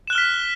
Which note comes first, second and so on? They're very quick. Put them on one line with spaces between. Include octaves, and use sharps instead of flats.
E7 F#6 G7 F6 B6